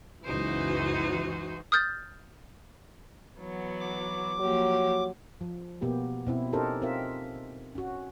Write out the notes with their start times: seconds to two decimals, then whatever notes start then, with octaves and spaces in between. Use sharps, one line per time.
0.25 C#2 F#2 C#3 E3 D#4 F#4 C5
1.72 D#6 F6 G6 A6
3.38 E3 F#3 B3
3.80 D6
4.40 F3 F#3 A#3 G4
5.41 F3
5.81 B2 A#3 B3 G4
6.27 B2 C4 E4
6.53 C#4 D#4 G4 A4 A#4 C5
6.82 C4 F4 A#4 E5
7.75 C#4 F#4